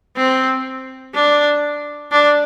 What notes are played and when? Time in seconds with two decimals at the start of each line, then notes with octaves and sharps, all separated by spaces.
0.17 C4
1.14 D4
2.12 D4